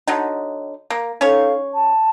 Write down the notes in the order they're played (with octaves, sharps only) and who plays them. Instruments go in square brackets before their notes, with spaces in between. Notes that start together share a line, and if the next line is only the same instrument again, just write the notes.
[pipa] D3 F#3 D#4
A#3
[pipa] C#4 C#5 [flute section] D#4 A4 F5
[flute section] A5